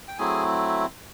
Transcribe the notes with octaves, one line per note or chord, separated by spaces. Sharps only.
G5
F#3 A3 C4 E4 G#4 G#5